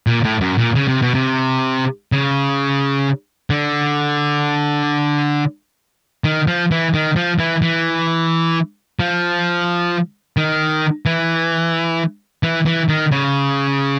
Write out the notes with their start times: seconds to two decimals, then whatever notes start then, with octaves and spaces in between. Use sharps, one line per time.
0.07 A#2
0.24 A2
0.41 F#2
0.58 A#2
0.75 C#3
0.88 C3
1.02 B2
1.15 C3
2.12 C#3
3.50 D3
6.24 D#3
6.48 F3
6.71 E3
6.94 D#3
7.16 F3
7.39 E3
7.62 E3
8.99 F3
10.37 D#3
11.06 E3
12.43 E3
12.66 E3
12.89 D#3
13.11 C#3